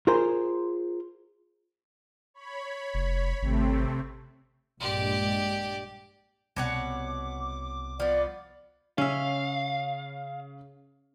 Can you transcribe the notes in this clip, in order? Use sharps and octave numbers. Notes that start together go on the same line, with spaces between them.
F4 G#4 A#4 C5
C#5 B5
F1
G#1 C3 A3 C4
A#1 G2 G#3 G4 D5
C2 B2 C#5 F#5 D6
F3 B3 D5
C#3 C#4 E5 F5